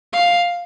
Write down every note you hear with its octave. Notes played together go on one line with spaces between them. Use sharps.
F5